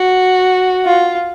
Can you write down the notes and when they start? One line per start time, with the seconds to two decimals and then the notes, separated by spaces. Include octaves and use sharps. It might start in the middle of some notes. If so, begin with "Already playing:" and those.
Already playing: F#4
0.85 F4